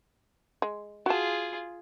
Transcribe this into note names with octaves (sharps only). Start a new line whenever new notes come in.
G#3
F4 F#4 G#4 A5